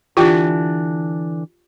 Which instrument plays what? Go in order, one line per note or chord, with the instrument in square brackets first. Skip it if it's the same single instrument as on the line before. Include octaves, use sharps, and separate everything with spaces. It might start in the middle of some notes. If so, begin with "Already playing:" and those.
[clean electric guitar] D3 E3 D4 [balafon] F4 G4 G5